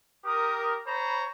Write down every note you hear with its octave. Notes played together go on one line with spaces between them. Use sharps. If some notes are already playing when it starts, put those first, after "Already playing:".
G4 A#4 D#6
C5 C#5 A#5 B5